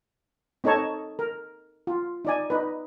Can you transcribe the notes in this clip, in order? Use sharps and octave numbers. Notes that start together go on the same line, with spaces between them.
C4 D#4 A4 C#5 A5
A#4
F4
D#4 D5 G#5
D#4 B4